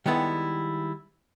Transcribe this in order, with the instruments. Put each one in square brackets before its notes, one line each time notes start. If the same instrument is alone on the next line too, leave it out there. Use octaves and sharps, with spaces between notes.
[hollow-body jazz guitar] D#3 G3 G#3 B3 E4 A4